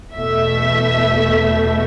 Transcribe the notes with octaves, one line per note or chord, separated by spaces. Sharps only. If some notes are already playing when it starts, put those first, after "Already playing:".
E2 B2 A3 E5